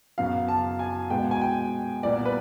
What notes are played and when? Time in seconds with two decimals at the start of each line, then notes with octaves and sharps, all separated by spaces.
0.18 F#2 C#3 F#3 B3 F5
0.48 A5
0.79 G#5
1.10 B2 G#3 B3 G5
1.31 G#5
1.41 G5
2.03 A#2 G3 B3 D5
2.25 B4